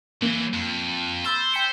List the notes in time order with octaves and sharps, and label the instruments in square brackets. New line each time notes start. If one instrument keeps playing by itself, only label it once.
[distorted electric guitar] E3 F#3 [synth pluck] A#3
[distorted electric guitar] F2
[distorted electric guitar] C5 [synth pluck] B5 E6 A6
[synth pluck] G5 B6 C#7